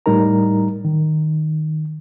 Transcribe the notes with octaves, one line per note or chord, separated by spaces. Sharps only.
A2 G3 D#4 A#4 A#5
D#3